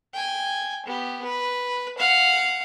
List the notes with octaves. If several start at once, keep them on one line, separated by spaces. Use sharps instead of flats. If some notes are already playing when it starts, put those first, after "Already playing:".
G5 G#5
B3 G4
B4
F5 F#5